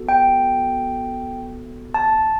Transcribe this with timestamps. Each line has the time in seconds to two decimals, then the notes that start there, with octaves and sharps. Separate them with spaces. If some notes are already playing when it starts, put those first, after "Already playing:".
Already playing: B3 F#4 A4
0.09 G5
1.94 A5